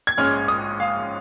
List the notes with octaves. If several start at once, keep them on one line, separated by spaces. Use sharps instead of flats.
G#6
A#1 G#2 G#3 C#4 F6
D#6
F5